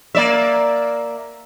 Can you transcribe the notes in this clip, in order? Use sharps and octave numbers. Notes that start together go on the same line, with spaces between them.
A#3 D5 E5